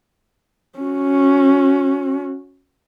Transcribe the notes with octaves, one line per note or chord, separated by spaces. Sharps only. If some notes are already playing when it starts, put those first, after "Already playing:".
C#4 F#4